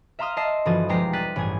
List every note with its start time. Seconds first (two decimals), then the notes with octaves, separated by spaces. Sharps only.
0.19 E5 F5 A#5 C6 D#6 F6
0.37 D#5 A5 E6 C7
0.66 G1 E3 F3 F#4 D#6 A6
0.89 E1 F3 G#3 G4 A#5 C7
1.13 G3 F#6 A6 B6 D#7
1.36 A1 G2 E3 G#4 G#6